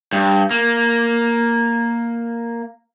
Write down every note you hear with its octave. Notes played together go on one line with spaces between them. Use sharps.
G2
A#3